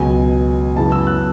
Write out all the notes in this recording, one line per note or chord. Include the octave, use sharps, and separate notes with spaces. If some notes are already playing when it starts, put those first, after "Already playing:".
Already playing: C#2 B2 F#3 B3 G#5
F#2 C#3 E3 B3 A5
E6
F#6